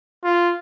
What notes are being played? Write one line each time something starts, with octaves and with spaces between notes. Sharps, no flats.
F4